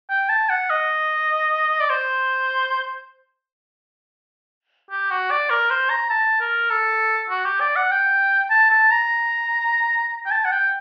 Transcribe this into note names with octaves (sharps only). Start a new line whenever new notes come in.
G5
A5
F#5
D#5
D5
C5
G4
F#4
D5
A#4
C5
A#5
A5
A#4
A4
F#4
G4
D5
F#5
G5
A5
A5
A#5
G5
A5
F#5
G5